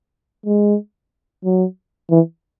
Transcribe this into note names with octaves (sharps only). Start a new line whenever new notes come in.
G#3
F#3
E3